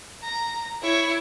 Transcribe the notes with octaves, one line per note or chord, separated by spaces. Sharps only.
A#5
E4 C#5